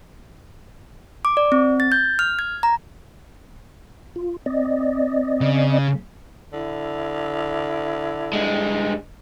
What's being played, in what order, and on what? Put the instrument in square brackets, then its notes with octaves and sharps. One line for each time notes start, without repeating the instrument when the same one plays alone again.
[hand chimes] D6
D5
C4
A6
G6
F6
G#6
A#5
[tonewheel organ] F4
C4 D5 D#5
[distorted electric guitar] C#3
[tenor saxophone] D3 [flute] E4
[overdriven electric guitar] G2 G#3